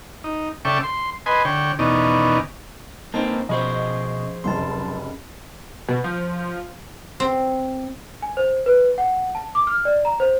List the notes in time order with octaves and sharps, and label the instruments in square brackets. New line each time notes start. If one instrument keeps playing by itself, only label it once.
[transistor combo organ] D#4
C#3 A4 D5 E5 G5 C#6
C6
B4 D#5 G#5 C6
D3 C#5 G5
E2 B2 D#3 C#4 D#4 D5
[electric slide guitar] A#3 C4 [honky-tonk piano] C#4 D#4 [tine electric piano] A5
[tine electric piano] B2 C#4 C#6 [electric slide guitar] F3 G#4 C5 [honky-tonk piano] D#5
[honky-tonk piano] F1 C#2 F#2 [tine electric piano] A5 C6
[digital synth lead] B2
F3
[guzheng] C4
[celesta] G#5
C5
B4
F#5
A5
D6
F6
D5
A#5
C5